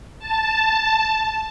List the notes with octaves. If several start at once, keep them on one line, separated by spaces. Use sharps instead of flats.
A5